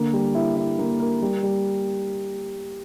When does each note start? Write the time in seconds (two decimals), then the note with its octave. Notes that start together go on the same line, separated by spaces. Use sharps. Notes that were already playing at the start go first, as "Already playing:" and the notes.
Already playing: D3 A#3
0.13 G3
0.35 E4
0.57 E4
0.79 A#3
1.00 A#4
1.22 G3
1.43 G3